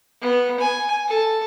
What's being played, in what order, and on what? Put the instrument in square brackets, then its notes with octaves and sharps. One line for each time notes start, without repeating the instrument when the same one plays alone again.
[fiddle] B3
G#5
A4